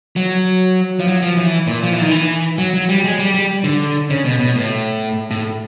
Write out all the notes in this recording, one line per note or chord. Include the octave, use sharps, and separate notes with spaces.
F#3
F3
F#3
F3
E3
A#2
F3
E3
D#3
E3
F#3
F#3
G3
G#3
G3
G3
D3
C#3
B2
B2
A2
A2